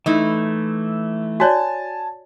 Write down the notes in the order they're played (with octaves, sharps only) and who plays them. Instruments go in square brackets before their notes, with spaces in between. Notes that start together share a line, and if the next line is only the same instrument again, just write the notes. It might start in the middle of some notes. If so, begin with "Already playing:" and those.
[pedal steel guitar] E3 A3 [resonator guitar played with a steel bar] D#4 E4
[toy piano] F#4 C#5 D5 [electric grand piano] G#5 A5